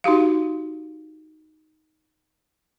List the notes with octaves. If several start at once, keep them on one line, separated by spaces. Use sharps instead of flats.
D#4 F#4 G4 F5